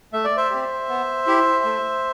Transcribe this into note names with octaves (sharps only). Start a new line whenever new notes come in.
A3 E5
D5
C5 E5
C4 G4
B3
E4 G4
A3